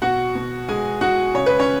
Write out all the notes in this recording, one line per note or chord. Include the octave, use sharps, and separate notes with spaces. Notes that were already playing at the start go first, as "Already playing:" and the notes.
B2 F#4 F#5
B2
G#3 G#4 G#5
G#3 F#4 F#5
C#3 C#5
B4
C#4 C#5